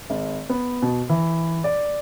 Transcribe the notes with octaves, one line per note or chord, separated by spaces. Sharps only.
G#1
B3
B2
E3
D5